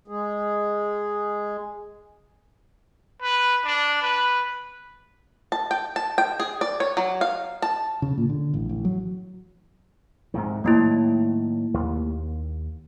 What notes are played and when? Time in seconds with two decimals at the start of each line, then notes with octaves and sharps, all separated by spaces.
0.08 G#3 G#4
3.22 B4
3.64 D4
4.02 B4
5.52 A5
5.71 G5
5.96 A5
6.18 G5
6.40 G#4
6.61 D5
6.80 C#5
6.97 F#3
7.21 F5
7.62 A5
8.02 C#3
8.18 A#2
8.29 D3
8.54 A1
8.69 A1
8.85 F#3
10.34 G#2 C3 D#3
10.64 A2 D#3 F#3 A3 A#3 E4
11.74 D#2